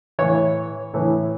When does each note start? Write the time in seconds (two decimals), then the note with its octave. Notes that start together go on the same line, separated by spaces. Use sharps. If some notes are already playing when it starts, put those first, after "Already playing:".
0.19 A2 E3 C#5
0.94 A2 E3